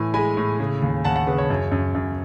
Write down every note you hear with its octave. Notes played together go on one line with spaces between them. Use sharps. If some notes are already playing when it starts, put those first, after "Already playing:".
Already playing: A2 E3 G#5
G#3 G#5 B5
A2
C#3
D#2
D#2 F#5 A5
F#5 A5
C#3 B4
C#5
F#2
F#2
F#2